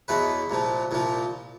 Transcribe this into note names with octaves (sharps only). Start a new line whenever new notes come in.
E2 B2 F#3 B4
C2 A#2 F3
C2 A#2 F3